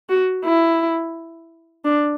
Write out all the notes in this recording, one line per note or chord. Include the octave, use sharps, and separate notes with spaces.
F#4
E4
D4